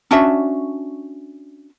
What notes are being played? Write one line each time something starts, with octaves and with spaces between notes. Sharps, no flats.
C#4 D4 F#4 E5